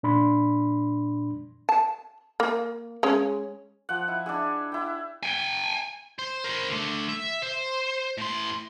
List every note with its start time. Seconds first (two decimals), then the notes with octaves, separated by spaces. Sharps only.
0.03 A#2 D4 B5 C6
1.69 A5
2.40 A#3
3.03 G#3 C#4
3.89 F3 F#5
4.08 E4
4.26 D4 E4 G#4
4.72 E4 G5
5.23 G5 G#5
6.19 C5
6.44 A#4 C5
6.69 D3 A3
7.09 E5
7.42 C5
8.18 A2 C6